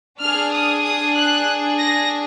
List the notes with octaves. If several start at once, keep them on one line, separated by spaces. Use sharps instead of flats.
D4 G#4 F6
D#6
D#6
F#6
A#6